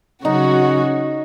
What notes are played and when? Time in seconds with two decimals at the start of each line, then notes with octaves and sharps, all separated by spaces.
0.24 C#3 F#3 C#4 D#4 F#4 C#5